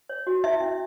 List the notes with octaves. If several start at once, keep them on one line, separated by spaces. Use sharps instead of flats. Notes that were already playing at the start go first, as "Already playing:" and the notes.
C#5
F#4
E4 E5
C#4